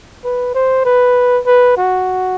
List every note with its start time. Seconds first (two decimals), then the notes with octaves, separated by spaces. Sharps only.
0.24 B4
0.55 C5
0.85 B4
1.46 B4
1.77 F#4